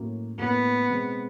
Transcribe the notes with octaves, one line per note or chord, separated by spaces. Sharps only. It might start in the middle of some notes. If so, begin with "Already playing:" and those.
Already playing: A2 F#3 A#3 C#4
A2 F#3 A#3 B3 C#4
B2 G#3 C4